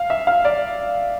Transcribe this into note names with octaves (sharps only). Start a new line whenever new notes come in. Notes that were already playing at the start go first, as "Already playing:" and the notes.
Already playing: F5
E5
F5
D5